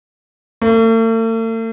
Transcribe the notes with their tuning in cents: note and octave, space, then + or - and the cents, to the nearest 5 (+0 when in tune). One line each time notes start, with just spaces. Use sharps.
A3 +45